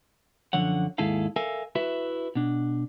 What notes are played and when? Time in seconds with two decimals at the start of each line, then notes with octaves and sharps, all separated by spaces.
0.53 F#2 D3 F3 C#5 F#5
0.98 D#2 G#2 E4 G#4 A4 F5
1.36 A4 A#4 E5 F5 G#5
1.75 E4 F#4 B4 E5
2.35 B2 D4